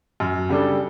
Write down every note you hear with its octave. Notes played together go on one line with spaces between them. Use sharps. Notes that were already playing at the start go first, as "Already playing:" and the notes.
F#2
C#3 G3 D4 A4